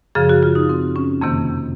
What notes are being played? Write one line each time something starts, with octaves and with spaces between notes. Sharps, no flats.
F#2 C#3 F3 G#4
F#4
F4
D#4
C4
C#4
F2 C3 D#3 A#3